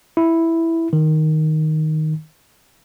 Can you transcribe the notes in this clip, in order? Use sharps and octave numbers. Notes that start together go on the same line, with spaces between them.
E4
D#3